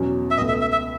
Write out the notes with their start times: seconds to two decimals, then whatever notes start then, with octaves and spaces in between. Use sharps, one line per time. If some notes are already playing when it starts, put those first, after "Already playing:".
Already playing: E2 B2 F#3 C#4 F#4
0.31 E5
0.37 C#2 B2 A3 D#5
0.49 E5
0.61 E5
0.72 E5